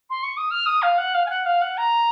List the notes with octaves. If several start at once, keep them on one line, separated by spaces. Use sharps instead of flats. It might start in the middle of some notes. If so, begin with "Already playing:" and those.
C6
C#6
D#6
F6
D#6
F5
F#5
F5
G#5
F#5
F5
F#5
A#5